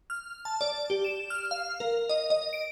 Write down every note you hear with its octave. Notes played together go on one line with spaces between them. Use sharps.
F6
A5
D5
G4
E7
F6
F5
A#4
D#5
D#5
D7